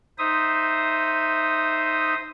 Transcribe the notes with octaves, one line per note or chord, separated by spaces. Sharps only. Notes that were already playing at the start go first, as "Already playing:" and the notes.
D#4 C5 E5 D#6